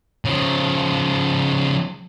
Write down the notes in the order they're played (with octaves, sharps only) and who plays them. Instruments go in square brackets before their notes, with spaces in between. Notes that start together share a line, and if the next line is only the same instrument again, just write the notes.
[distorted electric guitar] C#3 F3